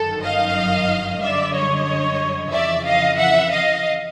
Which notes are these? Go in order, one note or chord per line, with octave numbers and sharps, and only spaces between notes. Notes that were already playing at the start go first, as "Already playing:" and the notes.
Already playing: G1 F#2 D#3 F#3 A4
D#5 F5
F#2 D3 G3 D5 E5
C#5 D#5
F2 C#3 E3 D5 E5
D#5 F5
E5 F#5
D#5 F5